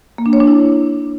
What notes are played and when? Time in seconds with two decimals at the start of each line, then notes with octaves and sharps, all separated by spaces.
0.18 A#3
0.26 D4
0.33 C#5
0.40 D4
0.47 E4